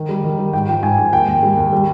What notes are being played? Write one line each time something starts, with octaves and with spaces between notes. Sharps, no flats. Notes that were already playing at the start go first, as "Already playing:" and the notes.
Already playing: D#3
G3
D#3
G3
G#2 G5
F3 G5
G#2 G#5
G#2
D#2 G5
D#2
G3
D#2
G3